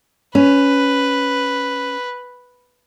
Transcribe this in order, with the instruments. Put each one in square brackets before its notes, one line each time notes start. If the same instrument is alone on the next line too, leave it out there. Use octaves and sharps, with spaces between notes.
[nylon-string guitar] C#4 [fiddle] B4